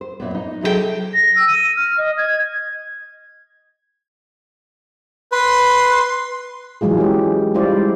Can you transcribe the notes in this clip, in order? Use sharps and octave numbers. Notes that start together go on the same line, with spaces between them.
C5
F#2 A#2 B3
D#4
C3 F#3 G#4 A4 C5 G5
A#6
E6
D#7
F6
D#5
G#6
B4 C6
E3 F#3 G#3 F4 G#4
C#4 G4
G3 G#3 E4 F4 C5 D5